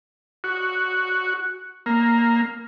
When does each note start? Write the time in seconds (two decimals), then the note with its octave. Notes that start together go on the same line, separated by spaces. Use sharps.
0.44 F#4
1.86 A#3